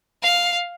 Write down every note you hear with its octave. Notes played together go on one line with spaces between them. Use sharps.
F5